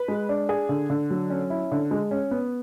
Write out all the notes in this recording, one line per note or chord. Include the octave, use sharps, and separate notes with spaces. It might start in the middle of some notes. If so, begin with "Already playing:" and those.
Already playing: B4
G#3
D4
G#4
D3
D3
F#3
C#4
E4
D3
G#3
C#4
B3